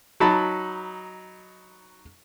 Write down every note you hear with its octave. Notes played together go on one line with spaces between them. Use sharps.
F#3 D#4 A5 B5